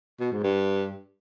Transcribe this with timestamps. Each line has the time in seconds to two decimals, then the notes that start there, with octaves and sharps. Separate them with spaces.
0.20 B2
0.32 G#2
0.44 G2